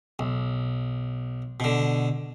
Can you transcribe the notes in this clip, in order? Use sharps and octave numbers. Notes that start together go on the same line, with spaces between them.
B1
B2 D3